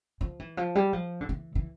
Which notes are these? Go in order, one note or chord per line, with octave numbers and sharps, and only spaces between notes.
F3
E3
F3
G3
F3
D3
E3
E3